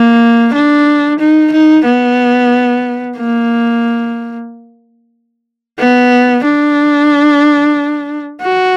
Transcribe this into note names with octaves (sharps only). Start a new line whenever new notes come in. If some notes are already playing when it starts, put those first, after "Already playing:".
Already playing: A#3
D4
D#4
D#4
B3
A#3
B3
D4
F#4